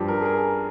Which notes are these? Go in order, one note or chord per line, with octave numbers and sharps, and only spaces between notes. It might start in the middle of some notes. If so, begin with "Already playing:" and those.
Already playing: G2 F3 G4
A#4
G#4
A#4